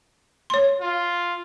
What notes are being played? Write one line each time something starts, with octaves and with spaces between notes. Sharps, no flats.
C#5 C6
F4